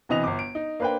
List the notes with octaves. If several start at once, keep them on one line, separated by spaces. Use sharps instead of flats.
B1 C3 E3 D#5 D#6 F7
G1 D6
D7
D#4
A#3 D4 B4 C5 G5